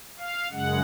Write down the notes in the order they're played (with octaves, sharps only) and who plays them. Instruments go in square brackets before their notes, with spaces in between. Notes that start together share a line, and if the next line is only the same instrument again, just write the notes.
[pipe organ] F5
F#2 C#3 G#3 F#5